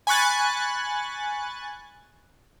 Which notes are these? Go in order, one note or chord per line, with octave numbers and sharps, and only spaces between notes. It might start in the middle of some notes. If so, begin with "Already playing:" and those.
G#5 B5 C#6 F#6 A6